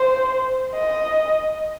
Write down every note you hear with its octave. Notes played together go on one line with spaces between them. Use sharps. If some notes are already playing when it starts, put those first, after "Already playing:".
Already playing: C5
D#5